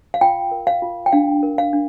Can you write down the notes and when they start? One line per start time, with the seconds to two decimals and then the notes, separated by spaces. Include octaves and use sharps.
0.14 F5
0.21 F4 G5
0.51 A#4
0.67 F5
0.82 F4
1.06 G5
1.12 D4 F5
1.43 A#4
1.58 F5
1.73 D4